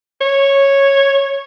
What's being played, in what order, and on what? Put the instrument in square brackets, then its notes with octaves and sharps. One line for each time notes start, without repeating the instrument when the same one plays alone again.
[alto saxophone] C#5